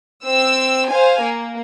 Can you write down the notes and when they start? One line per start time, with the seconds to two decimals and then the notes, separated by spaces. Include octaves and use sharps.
0.25 C4 E6
0.88 C5 F5 G#5
1.21 A#3